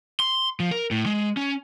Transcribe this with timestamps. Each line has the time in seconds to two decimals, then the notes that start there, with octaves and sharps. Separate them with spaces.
0.20 C6
0.60 F3
0.71 A#4
0.91 A2
1.06 G#3
1.37 C#4